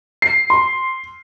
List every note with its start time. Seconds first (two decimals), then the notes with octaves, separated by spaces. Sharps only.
0.22 C7
0.50 C6